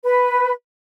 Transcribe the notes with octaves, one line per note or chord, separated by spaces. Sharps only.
B4